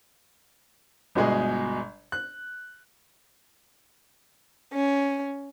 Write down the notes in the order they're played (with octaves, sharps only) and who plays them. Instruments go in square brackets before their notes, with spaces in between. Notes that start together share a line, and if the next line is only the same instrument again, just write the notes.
[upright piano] G1 B2 G#3 G#4
F#6
[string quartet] C#4